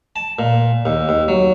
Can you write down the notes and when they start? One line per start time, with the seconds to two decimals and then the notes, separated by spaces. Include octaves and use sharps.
0.16 A5
0.39 A#2
0.86 D#2
1.09 D#2
1.28 F#3